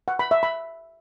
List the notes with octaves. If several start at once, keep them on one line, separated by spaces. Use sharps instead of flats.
F#5
B5
E5
B5